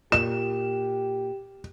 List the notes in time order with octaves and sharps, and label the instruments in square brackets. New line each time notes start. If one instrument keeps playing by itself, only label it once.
[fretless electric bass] A#2 [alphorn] G4 [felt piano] E7